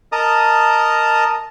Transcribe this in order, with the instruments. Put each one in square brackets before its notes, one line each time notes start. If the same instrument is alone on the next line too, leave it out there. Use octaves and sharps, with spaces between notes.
[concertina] A#4 D#5 A5 A#5 D#6